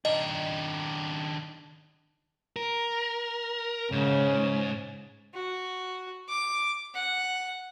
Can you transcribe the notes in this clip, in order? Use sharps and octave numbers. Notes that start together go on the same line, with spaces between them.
D#3 D4 D#5
A#4
G#2 C#3
F#4
D6
F#5